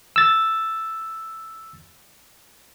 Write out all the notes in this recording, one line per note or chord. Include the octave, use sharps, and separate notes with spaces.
E6 A6